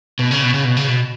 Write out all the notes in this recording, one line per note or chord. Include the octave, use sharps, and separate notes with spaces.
B2
C#3
B2
C#3
B2
C#3
B2